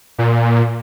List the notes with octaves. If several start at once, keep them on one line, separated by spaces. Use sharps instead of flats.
A#2